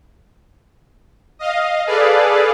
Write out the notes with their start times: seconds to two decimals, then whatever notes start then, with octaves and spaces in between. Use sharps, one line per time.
1.39 D#5 F5
1.86 G#4 A4 B4 D5 F5